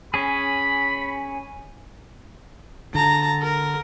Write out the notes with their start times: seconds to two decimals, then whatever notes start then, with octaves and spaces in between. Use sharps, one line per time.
0.14 C#4 G#4 B5
2.95 D3 A5 A#5
3.42 A#4